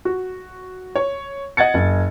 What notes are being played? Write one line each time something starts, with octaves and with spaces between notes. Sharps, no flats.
F#4
C#5
D#5 F#5 G#6 A6 C#7
F#1